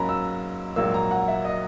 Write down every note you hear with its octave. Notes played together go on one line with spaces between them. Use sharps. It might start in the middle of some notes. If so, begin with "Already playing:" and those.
Already playing: G#2 F#3 A#3 C#4 A#5 B5
E6
A#1 G#2 F#3 A#3 E6
A#5
F#5
E5
D#5